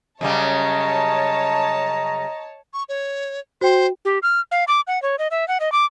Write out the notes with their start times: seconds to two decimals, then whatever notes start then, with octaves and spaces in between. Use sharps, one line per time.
0.21 F#2 C#3 G3 C#5 D#5 A5 A#5
2.73 C#6
2.89 C#5
3.61 F#4 C5 G5
4.05 G4
4.23 F6
4.51 F5
4.68 D6
4.87 F#5
5.02 C#5
5.19 D#5
5.31 E5
5.48 F#5
5.60 D#5
5.72 D6